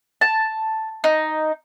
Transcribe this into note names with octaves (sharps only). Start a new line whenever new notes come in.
A5
D#4